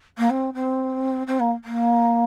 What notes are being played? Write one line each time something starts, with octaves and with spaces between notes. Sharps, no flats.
A#3
C4
C4
C4
A#3
A#3